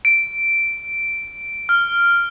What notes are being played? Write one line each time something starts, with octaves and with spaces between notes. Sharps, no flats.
D7
F6